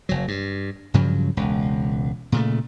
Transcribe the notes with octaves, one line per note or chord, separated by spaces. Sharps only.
F#1 F#3
G2
G2 C#3 F3 F#3
E1 C#2
A#2 C#3 A3